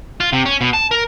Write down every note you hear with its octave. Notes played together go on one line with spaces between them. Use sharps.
F4
C3
C#4
B2
A5
A#4